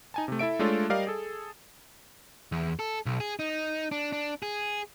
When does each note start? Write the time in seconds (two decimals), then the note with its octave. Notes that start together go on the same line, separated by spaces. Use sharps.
0.14 D#4 G#5 A5
0.28 C3 A3
0.39 E4 A4 E5 D7
0.59 G#3 A3 D4 F4 A4 C#5
0.90 G3 G4 A#4 D5 D#5 F5
1.07 G#4 A4
2.52 E2
2.79 A4
3.06 B1
3.20 G#4
3.39 D#4
3.92 D4
4.12 D4
4.43 G#4